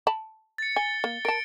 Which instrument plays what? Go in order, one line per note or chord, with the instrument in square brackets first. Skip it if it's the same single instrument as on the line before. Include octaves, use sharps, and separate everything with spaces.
[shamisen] A5 B5
[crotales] A6 C#7
[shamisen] G#5 [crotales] G7
[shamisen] A#3
[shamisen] A#4 A5 [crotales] D7